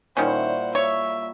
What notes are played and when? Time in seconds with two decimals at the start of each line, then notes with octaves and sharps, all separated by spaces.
0.17 A#2 D#3 G3 C#4 E4 C5 F#5
0.75 C#5 E5